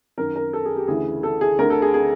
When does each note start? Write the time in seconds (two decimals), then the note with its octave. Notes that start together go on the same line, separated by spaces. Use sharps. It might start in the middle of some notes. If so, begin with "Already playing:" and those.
0.18 F#2 D#3 A#4
0.36 A#4
0.53 A4
0.65 G#4
0.76 G4
0.88 D2 C#3 E3 G#4
1.23 A4
1.41 G#4
1.58 D2 A#4
1.63 D3
1.70 A4
1.82 G#4
1.94 G#4